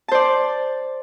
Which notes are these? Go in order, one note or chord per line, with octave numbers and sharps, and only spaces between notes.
C5 D5 A5